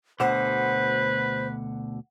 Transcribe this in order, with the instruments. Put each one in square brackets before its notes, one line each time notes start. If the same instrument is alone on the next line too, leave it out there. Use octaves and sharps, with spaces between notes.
[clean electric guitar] D2 B2 D3 [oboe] B4 [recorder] C5 [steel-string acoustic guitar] F#5